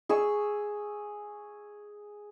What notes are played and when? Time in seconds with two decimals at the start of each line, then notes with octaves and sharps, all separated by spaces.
0.09 G#4 C#6 E6